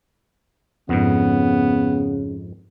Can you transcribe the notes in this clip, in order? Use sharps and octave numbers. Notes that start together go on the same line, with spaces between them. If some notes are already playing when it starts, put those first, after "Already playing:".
F2 G#2 C#3 B3